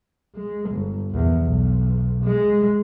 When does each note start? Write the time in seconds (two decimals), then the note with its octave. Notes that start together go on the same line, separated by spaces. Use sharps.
0.35 G#3
0.71 G1
1.10 A#1 E2
1.42 B1
2.23 G#3